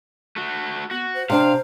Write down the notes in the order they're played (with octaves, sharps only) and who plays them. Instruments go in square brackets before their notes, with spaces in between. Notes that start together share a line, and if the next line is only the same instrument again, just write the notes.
[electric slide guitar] A3 F#4
[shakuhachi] B3 [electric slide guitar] F#4
[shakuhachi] C5
[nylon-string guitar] C3 D4 [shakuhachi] C5 [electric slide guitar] F5